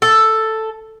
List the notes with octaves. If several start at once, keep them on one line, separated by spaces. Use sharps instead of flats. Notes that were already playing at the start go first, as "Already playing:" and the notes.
A4